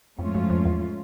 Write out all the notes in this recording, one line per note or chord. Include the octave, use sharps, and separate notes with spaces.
F2 G#2 F3 A3 C#4 F4
F#2
F2
E2